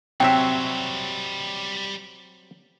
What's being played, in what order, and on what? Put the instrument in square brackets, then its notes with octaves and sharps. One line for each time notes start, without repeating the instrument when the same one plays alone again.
[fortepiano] C3 [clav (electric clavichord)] F#3 C4 E5 [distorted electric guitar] G3 C#5 [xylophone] G5